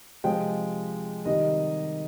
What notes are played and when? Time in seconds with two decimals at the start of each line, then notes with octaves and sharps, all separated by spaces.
0.24 C3 F3 G#3 G5
1.25 C3 D#3 G3 D#5